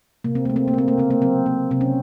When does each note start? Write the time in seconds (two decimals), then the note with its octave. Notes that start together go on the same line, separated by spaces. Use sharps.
0.24 C3 A#3
0.35 C4
0.45 A3 A#3
0.56 C4
0.68 A#3
0.74 A3 C4
0.88 A#3
0.98 C#3 C4
1.10 A#3
1.22 F#3 C4
1.46 A#3
1.71 C3 C4
1.81 C#4